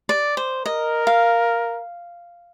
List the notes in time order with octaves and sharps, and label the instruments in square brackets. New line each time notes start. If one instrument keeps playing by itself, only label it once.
[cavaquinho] D5
C5
[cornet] A#4 [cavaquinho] D#5
[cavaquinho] F5